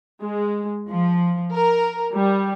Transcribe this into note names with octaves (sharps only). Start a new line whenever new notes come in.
G#3
F3
A#4
G3